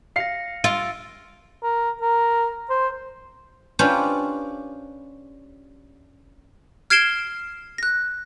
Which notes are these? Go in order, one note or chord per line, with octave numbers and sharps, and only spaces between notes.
F5 A#6 C7 C#7
F4 E6 A6 D7
A#4
A#4
C5
C#4 D4 F4 G4 B4 C5
F6 G#6 C7 D7 E7 G7
F#6 A#6